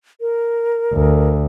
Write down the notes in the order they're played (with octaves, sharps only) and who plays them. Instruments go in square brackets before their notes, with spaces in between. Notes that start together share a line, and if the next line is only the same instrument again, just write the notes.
[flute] A#4
[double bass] D2